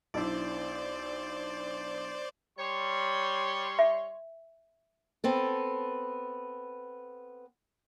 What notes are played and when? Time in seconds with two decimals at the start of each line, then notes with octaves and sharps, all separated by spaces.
0.14 B1 D4 E4 C5 D5
2.58 G3 C#5 C6
3.79 E5
5.24 B3 C4 A4